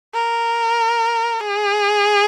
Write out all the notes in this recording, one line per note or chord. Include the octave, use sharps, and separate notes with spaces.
A#4
G#4